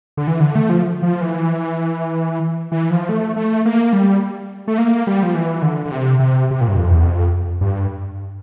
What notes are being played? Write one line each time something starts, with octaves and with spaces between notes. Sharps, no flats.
D3
E3
D3
A3
F3
F3
E3
E3
F3
A3
A3
A#3
G3
A3
A#3
G3
F3
E3
D3
D3
C3
C3
C3
A#2
G2
F2
E2
F2
G2